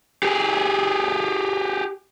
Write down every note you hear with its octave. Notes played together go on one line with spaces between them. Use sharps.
G4 G#4